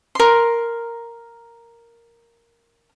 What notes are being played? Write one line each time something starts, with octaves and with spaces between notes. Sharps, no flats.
A#4 C6